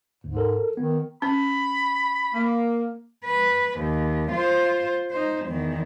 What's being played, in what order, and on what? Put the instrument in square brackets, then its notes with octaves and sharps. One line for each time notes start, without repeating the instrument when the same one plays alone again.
[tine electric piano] D2 [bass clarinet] G#2
[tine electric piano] A4 A#4
[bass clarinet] D#3 [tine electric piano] B3
[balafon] C#4 [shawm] B5
[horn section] A#3
[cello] B4
D#2
F4 C5
D#4 C5
E2 D#3